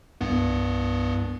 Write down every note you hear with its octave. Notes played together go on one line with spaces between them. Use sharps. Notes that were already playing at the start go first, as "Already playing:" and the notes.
C2 G2 B3